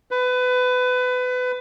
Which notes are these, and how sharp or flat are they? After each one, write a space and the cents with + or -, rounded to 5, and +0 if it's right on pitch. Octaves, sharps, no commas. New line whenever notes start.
B4 +25